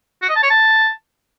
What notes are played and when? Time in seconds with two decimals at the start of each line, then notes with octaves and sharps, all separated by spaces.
0.22 F#4
0.29 D#5
0.36 A5
0.43 C#5
0.50 A5